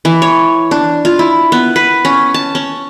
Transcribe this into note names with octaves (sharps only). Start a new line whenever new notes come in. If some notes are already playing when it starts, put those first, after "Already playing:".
E3
C#5
D4
F4
E4
B3
B4
C#4
A5
C#4